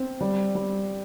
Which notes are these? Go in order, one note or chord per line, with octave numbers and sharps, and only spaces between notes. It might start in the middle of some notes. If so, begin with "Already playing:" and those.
Already playing: C4
G3
G3